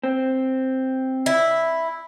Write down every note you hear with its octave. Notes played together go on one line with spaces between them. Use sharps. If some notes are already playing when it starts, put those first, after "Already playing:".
C4
E4